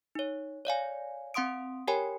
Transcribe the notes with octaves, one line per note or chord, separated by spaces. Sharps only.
D#4 C#5
C#5 D5 F5 G#5
C4 F#5 C6 D#6 D7
G4 A#4 C#5 G5 G#5 B5